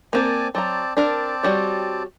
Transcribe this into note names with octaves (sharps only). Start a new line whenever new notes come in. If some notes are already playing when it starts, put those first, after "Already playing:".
A#3 C4 A#4 D5 G#5 A5
F#3 C4 D5 A5 A#5
C4 D4 A#4 D5 A5
G3 F#4 C#5